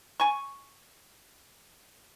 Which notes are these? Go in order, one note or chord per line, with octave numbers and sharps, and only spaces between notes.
G#5 C#6